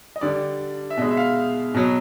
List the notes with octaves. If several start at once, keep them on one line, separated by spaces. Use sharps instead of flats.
D#5
D3 G3 D5
E5
B2 G#3 D#5
E5
F5
B2 F#3